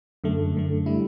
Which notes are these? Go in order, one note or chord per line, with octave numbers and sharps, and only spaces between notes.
F#2 D3 A3
F#2 D3 A3
D3 G3 E4